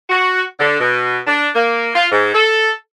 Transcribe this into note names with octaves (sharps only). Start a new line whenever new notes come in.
F#4
D3
B2
D4
A#3
F4
G#2
A4